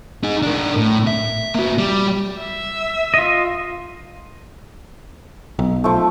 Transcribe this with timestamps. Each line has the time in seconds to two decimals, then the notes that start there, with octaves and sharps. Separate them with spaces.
0.23 D#4 G#4
0.42 D4 A#4
0.77 A2
1.07 E5
1.55 A#3 F#4
1.78 G3
2.39 E5
3.14 F4 D#5
5.59 B1
5.84 F3 A3